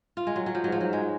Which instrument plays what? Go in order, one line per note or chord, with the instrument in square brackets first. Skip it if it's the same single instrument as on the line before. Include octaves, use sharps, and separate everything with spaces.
[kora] F4
G#3
F#3
F#3
F3
[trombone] G#2 [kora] F#3
[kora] F3
F#3
G#3